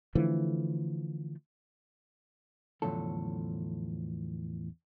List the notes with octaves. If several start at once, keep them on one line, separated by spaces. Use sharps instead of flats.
D3 E3 F3 A3
E2 A2 D3 F3 F#3 A4